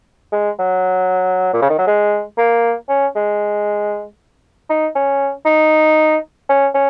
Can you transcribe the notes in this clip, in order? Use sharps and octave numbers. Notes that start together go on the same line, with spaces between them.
G#3
F#3
A#2
C#3
D#3
F#3
G#3
A#3
C#4
G#3
D#4
C#4
D#4
C#4
C#4